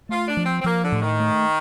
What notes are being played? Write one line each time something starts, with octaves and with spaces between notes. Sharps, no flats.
A3 F4
D4
F3
C4
C4
F3 A#3
D3
A2
D#3
A3